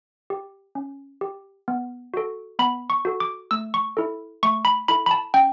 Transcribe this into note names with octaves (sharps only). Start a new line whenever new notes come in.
G4
C#4
G4
B3
F#4 A4
B3 B5
C#6
F#4 A4
D6
A3 E6
C#6
E4 A4
A3 C#6
B5
E4 A4 B5
B5
A5
C#4 G5